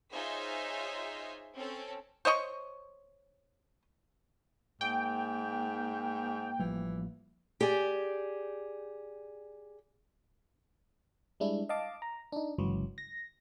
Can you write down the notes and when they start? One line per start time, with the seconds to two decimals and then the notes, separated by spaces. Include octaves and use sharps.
0.12 D#4 F4 G#4 C5 C#5 E5
1.55 C4 C#4 A4
2.25 C5 C#5 D#5 C#6
4.81 G#2 A#3 G5
6.59 A1 E3 F3 G3
7.61 G4 G#4 D5
11.40 G3 G#3 D4 E4
11.69 D#5 F5 A5 D6
12.02 A#5
12.32 D4 D#4
12.58 G1 C#2 E3 F#3
12.98 A#6